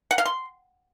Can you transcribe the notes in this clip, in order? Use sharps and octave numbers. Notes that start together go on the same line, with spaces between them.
F#5
F5
C6